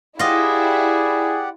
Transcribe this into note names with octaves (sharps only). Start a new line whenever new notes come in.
E4 F4 G4 G#4 D5 D#5 F#5